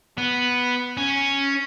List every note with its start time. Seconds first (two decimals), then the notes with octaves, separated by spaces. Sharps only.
0.18 B3
0.97 C#4